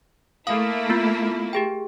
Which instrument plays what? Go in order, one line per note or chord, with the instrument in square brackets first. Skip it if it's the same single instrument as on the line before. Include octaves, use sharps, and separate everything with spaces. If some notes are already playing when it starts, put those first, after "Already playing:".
[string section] A3 A#3 E4 [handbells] F5 D#6
[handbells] B3 F4
G4 G#4 G5